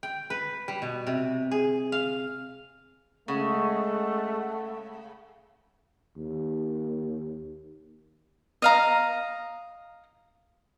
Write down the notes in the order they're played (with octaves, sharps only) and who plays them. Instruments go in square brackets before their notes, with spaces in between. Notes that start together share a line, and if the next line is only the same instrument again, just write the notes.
[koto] G5
B4
G3
B2
C3
G#4
F5
[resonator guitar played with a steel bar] C#3 [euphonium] G#3 [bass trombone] A3 [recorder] F#5
[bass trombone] D#2
[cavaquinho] D#5 F5 A#5